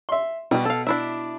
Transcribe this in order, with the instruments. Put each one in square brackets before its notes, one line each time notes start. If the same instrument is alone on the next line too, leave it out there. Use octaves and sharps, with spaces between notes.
[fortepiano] E5 C6
[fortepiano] B2 [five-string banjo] G3 F#4
[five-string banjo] A4 F5
D4 E4 E5